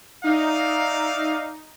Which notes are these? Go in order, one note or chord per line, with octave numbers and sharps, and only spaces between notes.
D#4 D5 E5 F5